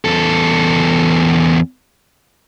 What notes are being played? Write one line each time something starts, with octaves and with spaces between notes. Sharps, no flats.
E2 A4